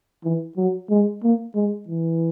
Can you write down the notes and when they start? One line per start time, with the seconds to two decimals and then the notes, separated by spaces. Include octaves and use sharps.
0.24 E3
0.57 F#3
0.90 G#3
1.23 A#3
1.55 G#3
1.88 E3